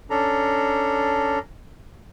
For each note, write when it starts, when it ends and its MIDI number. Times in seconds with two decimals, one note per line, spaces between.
0.10 1.39 61
0.10 1.39 62
0.10 1.39 69
0.10 1.39 82